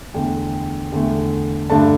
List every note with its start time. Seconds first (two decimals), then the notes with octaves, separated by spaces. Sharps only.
0.14 E2 D3 A3 G5
0.92 E2 D3 A3
1.69 G2 D3 A3 D4 A5